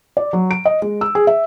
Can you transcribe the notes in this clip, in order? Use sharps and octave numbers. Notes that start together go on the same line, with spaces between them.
D5
F#3
D7
D#5
G#3
E6
G#4
E5